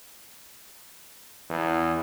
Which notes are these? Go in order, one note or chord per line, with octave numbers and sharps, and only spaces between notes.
E2